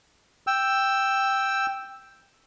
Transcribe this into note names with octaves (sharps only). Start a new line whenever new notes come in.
G5 E6